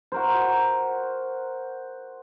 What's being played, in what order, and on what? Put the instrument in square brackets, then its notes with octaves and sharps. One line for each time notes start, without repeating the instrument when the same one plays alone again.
[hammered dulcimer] F#4 A#4 C5